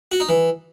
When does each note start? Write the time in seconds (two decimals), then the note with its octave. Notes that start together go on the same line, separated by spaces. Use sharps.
0.12 F#4
0.20 D#4
0.29 E3